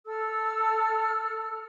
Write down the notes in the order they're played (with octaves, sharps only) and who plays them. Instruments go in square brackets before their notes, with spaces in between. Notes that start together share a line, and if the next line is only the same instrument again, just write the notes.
[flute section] A4 E6 F6